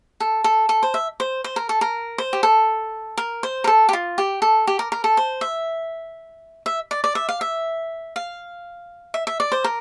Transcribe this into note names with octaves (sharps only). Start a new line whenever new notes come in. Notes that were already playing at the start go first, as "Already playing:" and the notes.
A4
A4
A4
C5
E5
C5
C5
A#4
A4
A#4
C5
G4
A4
A#4
C5
A#4
A4
G4
F4
G4
A4
G4
A#4
A#4
A4
C5
E5
E5
D5
D5
E5
F5
E5
F5
E5
E5
D5
C5
A#4